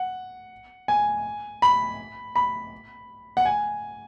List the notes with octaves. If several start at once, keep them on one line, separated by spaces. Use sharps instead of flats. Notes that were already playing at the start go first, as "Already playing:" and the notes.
Already playing: F#5
G#5
B5
B5
F#5
G#5